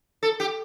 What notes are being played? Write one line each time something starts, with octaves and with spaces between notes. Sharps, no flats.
A4
G4